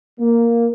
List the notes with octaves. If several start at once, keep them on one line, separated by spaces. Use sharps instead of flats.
A#3